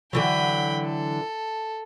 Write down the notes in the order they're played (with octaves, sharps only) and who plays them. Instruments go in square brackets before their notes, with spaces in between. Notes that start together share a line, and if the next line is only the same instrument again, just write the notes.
[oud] D3 E3 F#3 [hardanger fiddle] G5 B5
[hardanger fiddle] A4